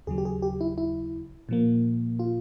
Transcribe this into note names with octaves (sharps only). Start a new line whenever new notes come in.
D#2 C#3 F#3 G#4
G4
G#4
G4
E4
E4
A#2 F3 A#3
F4